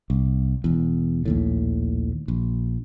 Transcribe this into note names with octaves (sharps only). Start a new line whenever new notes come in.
C2
E1 E2
A#1 D#2 A2
A#1